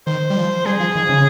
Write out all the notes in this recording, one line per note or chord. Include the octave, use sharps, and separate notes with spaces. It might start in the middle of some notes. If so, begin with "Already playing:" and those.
D#3 C5
G3
F3
G3 G#4
F3
D#3
C#3